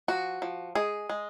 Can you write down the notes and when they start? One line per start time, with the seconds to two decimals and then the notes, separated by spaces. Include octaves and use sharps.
0.08 F3 F#4
0.42 F3
0.75 G#3 G#4
1.10 G#3